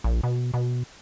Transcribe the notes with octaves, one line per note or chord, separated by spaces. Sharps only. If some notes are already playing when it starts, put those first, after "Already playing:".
A#1
B2
B2